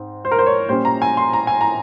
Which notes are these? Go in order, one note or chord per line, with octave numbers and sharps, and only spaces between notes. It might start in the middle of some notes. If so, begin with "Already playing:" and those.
Already playing: G#2 C4
C5
A#4
C5
C#5
A#2 G3 C#4 C5
A#5
G#5
C6
A#5
G#5
A#5